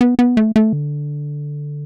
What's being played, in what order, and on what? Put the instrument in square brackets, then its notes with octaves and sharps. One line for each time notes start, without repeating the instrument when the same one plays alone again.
[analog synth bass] B3
B3
A3
A3
D3